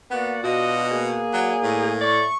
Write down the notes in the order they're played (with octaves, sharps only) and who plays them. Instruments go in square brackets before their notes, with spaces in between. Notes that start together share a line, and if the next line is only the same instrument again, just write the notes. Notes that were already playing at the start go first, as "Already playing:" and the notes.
[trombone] A#3 [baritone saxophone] B3 [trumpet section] F#4 D5 F#5
[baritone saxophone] B2 [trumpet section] D4 D#5 [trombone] F4 [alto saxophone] F#4
[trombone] A#3 [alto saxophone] G#4
[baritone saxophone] F#3 [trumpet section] D5 G#5 A#5
[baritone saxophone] A2
[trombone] A3 [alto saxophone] D5 [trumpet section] C#6